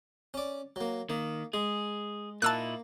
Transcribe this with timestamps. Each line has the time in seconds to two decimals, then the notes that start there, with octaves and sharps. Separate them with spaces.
0.34 C#4 D5
0.76 F#3 A#3
1.10 D#3 A#3
1.54 G#3 G#4
2.42 A#2 A#3 D#4 E4 A5 E6 F#6